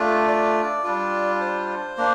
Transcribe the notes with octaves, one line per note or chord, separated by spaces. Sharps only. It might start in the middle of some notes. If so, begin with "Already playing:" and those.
Already playing: A3 D4 F4
D5
G3 D4 F4
C5
A#3 D4